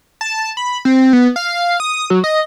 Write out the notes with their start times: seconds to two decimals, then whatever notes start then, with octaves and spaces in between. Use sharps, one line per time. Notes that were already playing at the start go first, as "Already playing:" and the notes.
0.21 A5
0.57 B5
0.85 C4
1.13 B3
1.36 F5
1.80 D#6
2.10 F#3
2.24 D#5